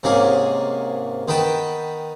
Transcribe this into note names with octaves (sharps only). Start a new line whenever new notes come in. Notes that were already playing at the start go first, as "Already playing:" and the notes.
G#2 C3 A#3 C#4 G#4
D#3 B3 B4 G5 A5